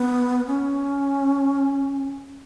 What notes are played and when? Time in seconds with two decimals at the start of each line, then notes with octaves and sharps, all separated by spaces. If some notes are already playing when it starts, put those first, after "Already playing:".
Already playing: B3
0.47 C#4